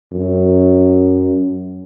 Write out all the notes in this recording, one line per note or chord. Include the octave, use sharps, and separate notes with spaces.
F#2